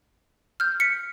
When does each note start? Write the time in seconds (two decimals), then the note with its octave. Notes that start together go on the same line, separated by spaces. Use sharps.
0.60 F6 G6
0.80 B6 C#7